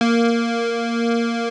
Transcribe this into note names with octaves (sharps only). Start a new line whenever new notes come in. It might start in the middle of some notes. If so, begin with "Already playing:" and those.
A#3